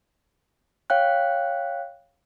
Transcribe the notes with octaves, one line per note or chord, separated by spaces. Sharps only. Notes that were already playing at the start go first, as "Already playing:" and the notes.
C#5 F5 G5 F#6